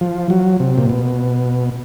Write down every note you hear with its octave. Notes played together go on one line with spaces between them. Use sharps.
F3
F#3
C3
A#2
B2